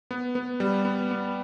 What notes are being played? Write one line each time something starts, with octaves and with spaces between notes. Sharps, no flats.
B3
B3
G3
B3
B3